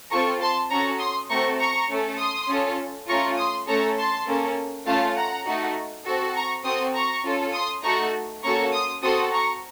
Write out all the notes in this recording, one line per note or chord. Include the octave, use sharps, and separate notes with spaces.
C4 F4 A4 A#5 C#6
A5 C6
C#4 F#4 A4 A#5 C#6
C6 D#6
A3 C4 F#4 A4 A#5 C#6
A#5 C#6
A3 C#4 A4
C6 D#6
C#4 F4 A4
A3 C#4 F4 A#5 C#6
C6 D#6
A3 C#4 A4 A#5 C#6
A5 C6
A#3 C#4 A4
A3 C#4 F4 F5 A5
F#5 A#5
A3 D#4 F#4
C4 F#4 A4
A#5 C#6
C4 F#4 A4 C6 D#6
A#5 C#6
C#4 F4 A4
C6 D#6
A3 D#4 F#4 A4 A#5 C#6
A#3 C#4 F#4 A4 A#5 C#6
C6 D#6
C4 F#4 A4 C6 D#6
A#5 C#6